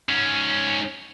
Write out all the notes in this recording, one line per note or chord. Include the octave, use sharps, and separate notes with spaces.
G#2 C#4